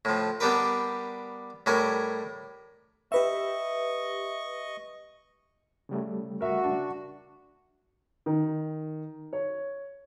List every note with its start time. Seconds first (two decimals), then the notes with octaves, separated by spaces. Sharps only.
0.05 A2 F3
0.40 G3 B3 D4 G4 A#4 B4
1.66 A2 G3 A#4 G#5 C#6
3.12 G4 B4 D#5 E5 C#6
5.89 C#3 G3 A3
6.41 F#4 A#4 E5
6.64 D4
8.26 D#3
9.33 C#5